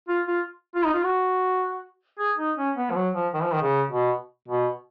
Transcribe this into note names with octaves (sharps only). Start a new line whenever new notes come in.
F4
F4
F4
D#4
F4
F#4
G#4
D#4
C#4
B3
F3
F#3
F3
D#3
F3
D#3
C#3
B2
B2